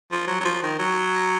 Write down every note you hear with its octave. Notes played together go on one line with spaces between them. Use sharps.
F3
F#3
F#3
F3
D#3
F#3